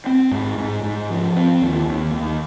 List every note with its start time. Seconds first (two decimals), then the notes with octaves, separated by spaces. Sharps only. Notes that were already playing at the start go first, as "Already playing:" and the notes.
0.06 C4
0.31 G#2
0.58 G#2
0.83 G#2
1.10 F3
1.36 C4
1.62 D#2
1.88 D#2
2.14 D#2